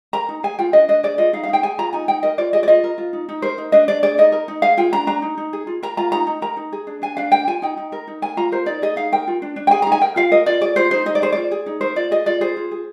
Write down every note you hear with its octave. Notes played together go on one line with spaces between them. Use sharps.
A#4 A#5
D#4
G#4 G#5
F4 G5
D4 D#5
D4 D#5
G#4 D5
F4 D#5
D#4 F5
F5
D#4 G5
G#4 G#5
F4 A#5
D#4 G#5
D#4 G5
A#4 D#5
F4 D5
G#4 D#5
D5
F4 D#5
A#4
F4
D#4
D#4
A#4 C5
D#4
D4 D#5
D4 D5
G#4 D5
D#4 D#5
A#4
D#4
G#4 F5
F4 G5
D4 A#5
D4 A#5
D#4
D#4
G#4
F4
A#4 A#5
F4 A#5
D#4 A#5
D#4
A#4 A#5
D#4
G#4
D4
D4 G#5
D4 F5
A#4 G5
F4 G#5
D#4 G5
D#4
A#4
D#4
A#4 G#5
F4 A#5
A#4 C5
D#4 D5
G#4 D#5
D#4 F5
A#4 G5
F4
D4
D4
G5
G#4 G#5
A#5
D#4
G#5
A#4 G5
F4 F5
A#4 D#5
F4 D5
G#4 D5
F4 C5
D#4 C5
D#4 D#5
D5
G#4 C5
F4 D5
G#4
D#4
A#4 C5
F4 D5
G#4 D#5
F4 D5
G#4 C5
F4
G#4